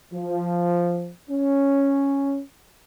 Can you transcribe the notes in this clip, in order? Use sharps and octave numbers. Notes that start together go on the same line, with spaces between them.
F3
C#4